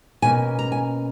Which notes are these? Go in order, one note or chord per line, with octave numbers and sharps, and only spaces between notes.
B2 A#3 C#4 G#5
A#5
G#5